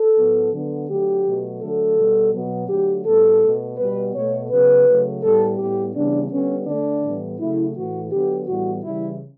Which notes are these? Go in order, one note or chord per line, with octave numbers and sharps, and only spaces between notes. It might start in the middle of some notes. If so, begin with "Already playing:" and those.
Already playing: A4
A2 F#3 B3
D3 F#3 B3
D3 F#3 A3 G4
B2 F#3 A3
D3 F#3 A3 A4
B2 G3 B3
B2 F#3 B3
D3 F#3 A3 G4
A2 G3 B3 A4
B2 A3
B2 G3 B3 B4
B2 A3 C#5
C#3 F#3 B3 B4
C#3 F#3 A3
A2 G3 B3 A4
A2 G3 B3 G4
C#3 E3 G3 B3 D4
D3 G3 B3 C#4
D3 A3 D4
A2 E3 G3 B3
C#3 F#3 A3 E4
A2 E3 A3 F#4
D3 F#3 B3 G4
A2 E3 G3 B3 F#4
C#3 E3 G3 E4